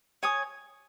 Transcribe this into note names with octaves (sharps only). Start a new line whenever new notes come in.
C#5 G#5 D#6